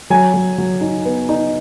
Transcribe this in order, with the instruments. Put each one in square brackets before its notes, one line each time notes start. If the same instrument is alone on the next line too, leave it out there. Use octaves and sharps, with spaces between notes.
[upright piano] F#3 G#5
F#3
F#3
D#4
B3
D#4